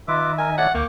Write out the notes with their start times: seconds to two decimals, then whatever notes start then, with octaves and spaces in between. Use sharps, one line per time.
0.08 D#3 F4 B4 D#5 E5 A#5 D6
0.38 A#4 G#5
0.58 A3 C#5 D5 F#5
0.75 D2 A#3 G5 C#6 D6